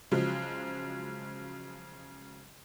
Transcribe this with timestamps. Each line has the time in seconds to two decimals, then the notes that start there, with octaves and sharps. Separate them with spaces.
0.11 C#3 F3 F#3 G#3